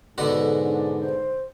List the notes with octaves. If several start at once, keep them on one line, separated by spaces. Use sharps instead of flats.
G#2 B2 D3 F#4 A4
D4
C5